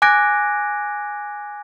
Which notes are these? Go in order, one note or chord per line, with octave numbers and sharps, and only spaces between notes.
G#5 D6 F#6 G#6 A#6 D7